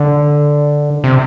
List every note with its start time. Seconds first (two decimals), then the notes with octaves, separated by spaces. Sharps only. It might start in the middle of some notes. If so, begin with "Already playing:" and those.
Already playing: D3
1.04 C3